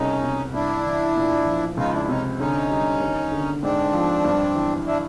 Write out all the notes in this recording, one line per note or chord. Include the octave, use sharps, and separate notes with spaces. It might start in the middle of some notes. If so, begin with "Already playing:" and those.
Already playing: C2 C#3 C#4 D#4
C3
G2 D4 E4
E3
A#2
F3
C#2 D#4 F4
D4 E4
C3 C#4 D#4
D3 C#4 D#4
G3
D#2
D3
G#2 C4 D4
F3
G2
E3
D4 E4